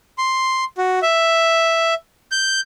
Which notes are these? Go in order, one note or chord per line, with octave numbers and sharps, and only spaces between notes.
C6
F#4
E5
G6